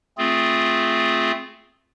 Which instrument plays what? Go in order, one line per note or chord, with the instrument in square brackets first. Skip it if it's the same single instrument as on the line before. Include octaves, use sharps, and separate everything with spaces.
[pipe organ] A3 C4 F4 G#4